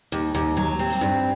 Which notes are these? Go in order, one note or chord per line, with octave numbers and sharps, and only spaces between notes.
D#2
D#2
F#3
C4
G2